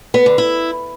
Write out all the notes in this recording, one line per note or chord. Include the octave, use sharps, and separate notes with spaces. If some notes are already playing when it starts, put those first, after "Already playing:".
B3
D3
E4